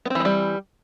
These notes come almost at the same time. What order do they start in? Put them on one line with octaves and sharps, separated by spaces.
B3 C4 E3 G#3 G3